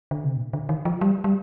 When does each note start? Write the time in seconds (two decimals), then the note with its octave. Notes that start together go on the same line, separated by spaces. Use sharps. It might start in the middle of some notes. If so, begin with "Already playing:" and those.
0.11 D3
0.24 C3
0.37 A#2
0.53 D3
0.69 D#3
0.85 F3
1.01 G3
1.24 G3